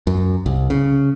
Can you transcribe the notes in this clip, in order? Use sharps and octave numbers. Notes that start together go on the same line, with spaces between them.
F#2
C2
C#3